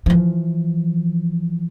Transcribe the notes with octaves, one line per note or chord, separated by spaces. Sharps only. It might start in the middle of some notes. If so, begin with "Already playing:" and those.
E3 F3